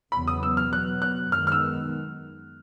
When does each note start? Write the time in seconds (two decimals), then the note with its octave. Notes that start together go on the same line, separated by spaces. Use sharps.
0.12 E2 C#3 F#3 B3 B5
0.28 D#6
0.43 E6
0.57 F6
0.72 B2 F#3 B3 F#6
1.02 F#6
1.32 F#2 D#3 G#3 B3 F6
1.47 F6
1.52 E6